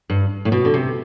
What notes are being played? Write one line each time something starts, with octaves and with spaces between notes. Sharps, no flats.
G2
A2
B2
D3
C3